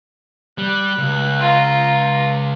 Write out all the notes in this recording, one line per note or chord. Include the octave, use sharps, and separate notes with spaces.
G3 F#6
C#2
F4 A#5